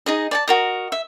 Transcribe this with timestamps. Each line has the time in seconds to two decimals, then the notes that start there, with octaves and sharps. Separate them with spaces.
0.06 D#4 G#4 D#5
0.31 D5 G#5 A5
0.48 F#4 A#4 D#5
0.92 E5